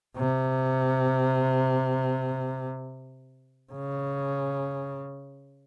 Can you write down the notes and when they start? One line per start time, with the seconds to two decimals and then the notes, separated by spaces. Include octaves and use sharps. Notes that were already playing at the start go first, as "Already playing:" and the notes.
0.17 C3
3.73 C#3